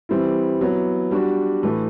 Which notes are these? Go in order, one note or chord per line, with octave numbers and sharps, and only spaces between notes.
E3 G3 C4 E4
F#3 B3 E4
G3 D4 F#4
A2 E3 A3